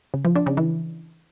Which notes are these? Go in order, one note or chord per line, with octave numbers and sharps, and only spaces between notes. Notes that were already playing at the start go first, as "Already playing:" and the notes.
C#3
F3
D4
C#3
E3